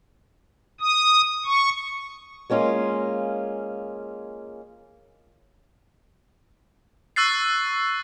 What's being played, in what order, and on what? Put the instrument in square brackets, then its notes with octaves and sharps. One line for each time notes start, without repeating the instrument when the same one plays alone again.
[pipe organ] D#6
C#6
[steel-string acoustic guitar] G#3 A#3 C#4 F4
[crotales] C#6 E6 F#6 A6 C7